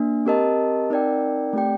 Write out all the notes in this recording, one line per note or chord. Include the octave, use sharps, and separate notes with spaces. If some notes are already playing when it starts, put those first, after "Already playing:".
Already playing: A#3 D4
C4 G4 A#4 D#5 A5
C4 D#4 A#4 D5 G5
A3 C4 G4 D5 G5